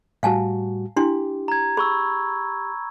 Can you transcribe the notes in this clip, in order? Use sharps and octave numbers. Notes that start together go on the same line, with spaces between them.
A2 G3 F#4 F5 G#5 A5
D4 E4 G4 C6
A#5 G#6
G#4 B5 C#6 E6